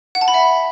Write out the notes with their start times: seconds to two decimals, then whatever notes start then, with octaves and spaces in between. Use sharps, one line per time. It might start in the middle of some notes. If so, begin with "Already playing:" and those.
0.15 F#5
0.21 A5
0.28 B5
0.34 E5